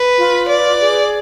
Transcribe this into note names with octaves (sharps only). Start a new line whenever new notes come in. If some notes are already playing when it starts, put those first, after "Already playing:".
Already playing: B4
F4
B4 D5
G#4